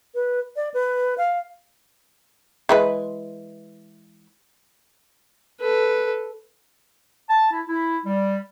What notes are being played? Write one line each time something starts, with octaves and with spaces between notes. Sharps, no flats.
B4
D5
B4
F5
E3 G#3 B4
A4 B4
A5
E4
E4
G3